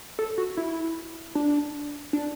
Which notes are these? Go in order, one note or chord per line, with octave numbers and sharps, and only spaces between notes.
A4
F#4
E4
D4
D4